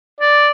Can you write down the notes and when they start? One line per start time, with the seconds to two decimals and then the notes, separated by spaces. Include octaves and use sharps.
0.21 D5